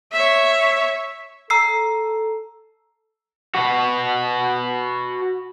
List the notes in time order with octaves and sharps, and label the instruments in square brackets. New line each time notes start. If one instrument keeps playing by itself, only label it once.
[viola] C#5 E5
[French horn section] A4 [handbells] A#5 E6 C7
[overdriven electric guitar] F#4 B4